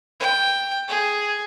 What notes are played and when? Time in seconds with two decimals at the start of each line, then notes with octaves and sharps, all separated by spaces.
0.20 G5
0.88 G#4